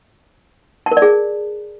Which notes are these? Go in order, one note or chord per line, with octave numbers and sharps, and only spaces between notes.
A5
A#4
D5
G#4